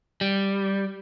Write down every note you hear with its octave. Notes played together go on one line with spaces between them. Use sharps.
G3